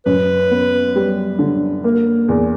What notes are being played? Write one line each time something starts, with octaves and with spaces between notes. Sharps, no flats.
F#2 B4
B3
G3
D3
A#3
E2